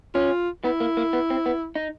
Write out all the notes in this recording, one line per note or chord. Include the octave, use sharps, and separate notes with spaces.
C#4 F4
B3 E4
A#3
A#3
B3
C4
B3
D#4